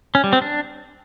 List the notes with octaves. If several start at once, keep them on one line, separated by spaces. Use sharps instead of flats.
C#4
G3
C4
D4